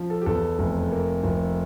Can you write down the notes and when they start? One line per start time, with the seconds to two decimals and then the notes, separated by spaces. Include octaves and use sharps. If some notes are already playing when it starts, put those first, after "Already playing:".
Already playing: F3
0.10 A4
0.22 G4
0.26 E2 A4
0.59 F1
0.91 A#3
1.23 F1